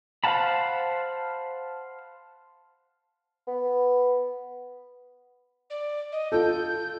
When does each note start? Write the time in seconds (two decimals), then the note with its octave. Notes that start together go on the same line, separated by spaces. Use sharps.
0.24 C5 F5 F#5 A5 B5
3.47 B3
5.70 D5
6.12 D#5
6.32 F4 A4 G6